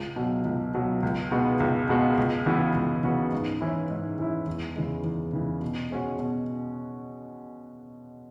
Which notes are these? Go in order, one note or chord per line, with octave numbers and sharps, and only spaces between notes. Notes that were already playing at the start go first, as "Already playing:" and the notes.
Already playing: C#2
B2 F#3
C#2
B2 F#3
C#2
B2 G#3 B3 F#4
C#2
B2 G#3 B3 F#4
C#2
C#3 E3 B3 F#4
C#2
C#3 E3 B3 F#4
G#2
E3 C#4 E4
G#2
E3 C#4 E4
E2
C#3 E3 G#3
E2
C#3 E3 G#3
B2
G#3 C#4 F#4
B2